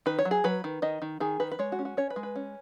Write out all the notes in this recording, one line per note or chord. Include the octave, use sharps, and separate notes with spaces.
D#3 B4
C#5
F#3
G#4
F#3 B4
D#3
D#3 D#5
D#3
D#3 G#4
D#3 B4
B4
G#3 C#5
F#4
C#4
F#4
C#4 C#5
B4
G#3
B4
C#4